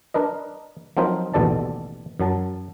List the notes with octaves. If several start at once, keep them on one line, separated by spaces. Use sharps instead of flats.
D4 A#4 B4 D#5
F3 F#3 C4 D#4 A#4 C5
A1 D#2 B2 A4 D5 A5
F#2 F#3 A5